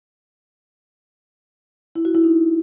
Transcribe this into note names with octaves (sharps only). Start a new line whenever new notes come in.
E4
F#4
E4
D#4